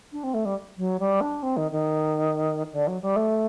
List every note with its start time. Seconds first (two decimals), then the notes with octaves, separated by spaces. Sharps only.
0.12 D4
0.23 C4
0.34 A3
0.45 G3
0.77 F#3
0.99 G3
1.21 D4
1.42 C4
1.57 D#3
1.71 D#3
2.72 D3
2.87 F#3
3.01 G3
3.16 A3